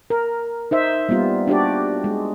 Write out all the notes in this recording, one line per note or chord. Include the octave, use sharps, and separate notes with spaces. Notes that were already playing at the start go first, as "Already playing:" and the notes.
A#4
D#4 C5 E5
G3 A#3 B3 F4
D4 F#4 G4 D5
G#3